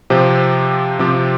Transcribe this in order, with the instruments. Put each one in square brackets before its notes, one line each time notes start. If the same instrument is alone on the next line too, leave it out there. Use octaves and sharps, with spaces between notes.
[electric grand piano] C3 F3 C4 G4
C3 F3 C4 G4